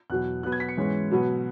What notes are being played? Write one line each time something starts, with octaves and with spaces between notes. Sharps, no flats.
E2 B2 F#3 F#6
B2 F#3 B3 F#6
G#6
B6
C#7
G#2 E3 G#3 C#4
B2 F#3 B3